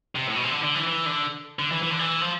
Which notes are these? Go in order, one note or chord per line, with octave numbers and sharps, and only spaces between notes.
C3
A2
B2
C3
D3
D3
E3
E3
D3
D3
E3
E3
D3
E3
F3